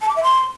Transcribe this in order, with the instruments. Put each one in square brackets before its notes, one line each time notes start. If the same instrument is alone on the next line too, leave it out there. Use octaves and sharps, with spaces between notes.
[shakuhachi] A5
D6
E5
C6